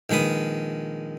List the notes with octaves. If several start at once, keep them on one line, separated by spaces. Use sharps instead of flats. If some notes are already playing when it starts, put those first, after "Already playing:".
A#1 D#3 G#3 B4 D#6